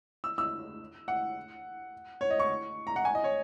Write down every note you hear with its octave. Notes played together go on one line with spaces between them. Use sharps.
E6
E6
F#5
C#5
D#5
C#6
A#5
F#5
G#5
D#5
C#5